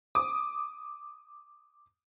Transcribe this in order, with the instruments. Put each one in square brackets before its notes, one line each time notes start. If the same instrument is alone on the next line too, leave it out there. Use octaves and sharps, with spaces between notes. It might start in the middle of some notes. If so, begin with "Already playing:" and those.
[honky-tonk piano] D6 D#6